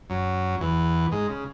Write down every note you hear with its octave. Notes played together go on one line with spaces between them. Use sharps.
F#2 F#3
E2 E3
G#2 G#3
C#3